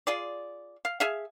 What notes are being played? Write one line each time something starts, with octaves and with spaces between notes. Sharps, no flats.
F4 G#4 D5
F5
G#4 E5 F5